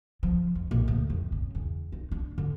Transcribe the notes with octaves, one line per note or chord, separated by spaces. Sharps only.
F3
F2
A#1
D2
F2
C#3
E2
D#4
D4
D3